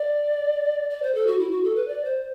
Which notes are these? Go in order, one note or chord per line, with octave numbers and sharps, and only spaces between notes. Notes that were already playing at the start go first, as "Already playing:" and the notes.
Already playing: D5
D5
C5
A4
F#4
E4
F#4
A4
B4
D5
C5